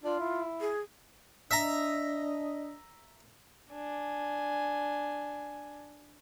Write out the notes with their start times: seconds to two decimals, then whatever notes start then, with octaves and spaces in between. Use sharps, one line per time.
0.04 D4 F4
0.20 E4
0.61 G#4
1.51 D4 D#5 E5 A#5
3.71 D4 G#5